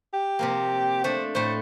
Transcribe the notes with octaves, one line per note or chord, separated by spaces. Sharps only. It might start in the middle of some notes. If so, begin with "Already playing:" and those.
G4
C3 F3 A#3
A3 D4 C5
A2 A3 C5